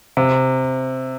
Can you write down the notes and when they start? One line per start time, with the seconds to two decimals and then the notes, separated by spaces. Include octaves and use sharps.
0.17 C3